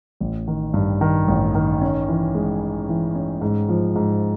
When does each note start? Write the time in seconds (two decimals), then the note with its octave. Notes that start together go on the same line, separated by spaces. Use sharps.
0.20 A1
0.48 D#3
0.74 G2
1.01 D#3
1.28 A1
1.55 D#3
1.81 C#4
2.08 E3
2.35 G#3
2.62 C#4
2.89 E3
3.15 C#4
3.41 G#2
3.69 F3
3.96 G#2